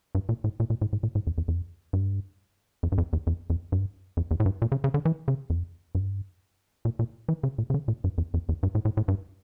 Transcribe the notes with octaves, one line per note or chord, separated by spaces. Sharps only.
G2
A#2
A2
A#2
A#2
A2
A2
A#2
A2
F2
F2
F2
G2
F2
G2
F2
E2
F2
F2
G2
F2
E2
A2
G2
A#2
C#3
C#3
D3
E3
C#3
F2
G2
A#2
A#2
E3
C#3
A#2
C#3
D3
A#2
G2
F2
F2
E2
G2
A2
A2
A2
G2